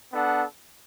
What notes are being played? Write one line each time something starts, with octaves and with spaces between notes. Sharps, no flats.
B3 D4 A4 F#5